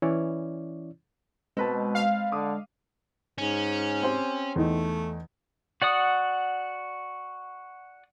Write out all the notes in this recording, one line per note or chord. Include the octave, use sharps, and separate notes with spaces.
E3 C#4 E4 C#5 D5
B2 G#3 C4 B4 A5
F5
D3 D6 D#6
G#2 C#4
C4 G4 C5
E2 A3 D#4
F#4 D5 F#5 D#6